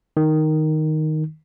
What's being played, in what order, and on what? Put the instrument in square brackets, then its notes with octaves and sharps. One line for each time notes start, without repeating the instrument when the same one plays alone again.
[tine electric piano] D#3